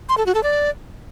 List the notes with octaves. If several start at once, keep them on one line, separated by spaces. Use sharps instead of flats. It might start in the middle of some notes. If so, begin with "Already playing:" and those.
C6
A4
F#4
A4
D5